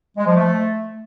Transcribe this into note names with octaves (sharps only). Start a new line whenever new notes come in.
G#3
F3
A3